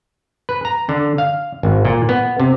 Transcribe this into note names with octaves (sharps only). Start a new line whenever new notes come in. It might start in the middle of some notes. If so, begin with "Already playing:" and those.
B4
A#5
D3
F5
G#1
A#2
B3
C3